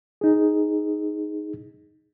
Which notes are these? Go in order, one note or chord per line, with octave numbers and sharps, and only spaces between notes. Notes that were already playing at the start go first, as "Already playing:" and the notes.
D#4 G#4